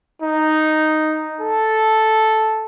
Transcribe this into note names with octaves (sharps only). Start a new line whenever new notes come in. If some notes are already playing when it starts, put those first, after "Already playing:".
D#4
A4